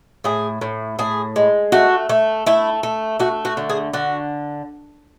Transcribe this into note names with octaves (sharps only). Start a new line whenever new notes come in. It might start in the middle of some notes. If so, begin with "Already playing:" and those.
A2 G#4
A2
A2 G#4
G#3
A3 F#4
A3
A3 E4
A3
A3 F#4
F#4
D3
G#4
D3 F#4